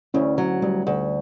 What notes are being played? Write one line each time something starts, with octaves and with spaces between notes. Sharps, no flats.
D2 C#4 E4
F#3
D2 G3
D2